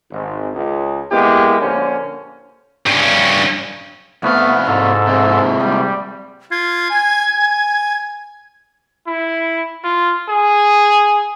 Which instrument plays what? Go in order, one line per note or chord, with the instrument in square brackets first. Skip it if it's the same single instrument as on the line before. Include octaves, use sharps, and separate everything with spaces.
[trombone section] G#1
C#2
G#3 A#3 B3 E4 G4
A#1 D3 A#3 C#4 C5
[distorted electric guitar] G2 C#4
[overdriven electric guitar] C2 F5 [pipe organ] A3 B3
[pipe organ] G#2 A4
[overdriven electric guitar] C3 G#3
[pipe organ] G3
[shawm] F4 [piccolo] G#6
[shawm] G#5
G#5
[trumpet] E4
F4
G#4